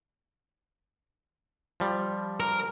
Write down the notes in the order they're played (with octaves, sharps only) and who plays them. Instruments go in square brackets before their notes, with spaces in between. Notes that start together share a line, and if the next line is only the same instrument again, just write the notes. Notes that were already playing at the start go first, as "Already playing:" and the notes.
[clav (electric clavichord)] F3 G3
[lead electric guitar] A#4